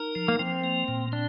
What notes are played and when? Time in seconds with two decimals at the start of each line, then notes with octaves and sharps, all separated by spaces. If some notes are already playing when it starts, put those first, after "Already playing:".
Already playing: D#4 A#4
0.15 F3
0.28 A#3
0.39 F3 C4
0.64 A#3
0.88 A#2
1.12 C4 D4